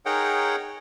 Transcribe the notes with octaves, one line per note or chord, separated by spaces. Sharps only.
D#4 G#4 A#4 C#5 F#5 G5